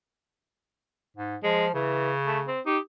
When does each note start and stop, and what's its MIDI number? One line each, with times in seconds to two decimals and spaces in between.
1.17 1.36 44
1.43 1.70 53
1.43 1.66 56
1.74 2.53 49
1.74 2.11 52
2.26 2.39 57
2.47 2.60 60
2.66 2.79 63
2.66 2.78 67